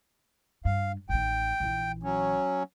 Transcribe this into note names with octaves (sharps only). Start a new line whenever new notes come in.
G2 F5
A1 D#3 G5
A#1 E3
F#3 C#4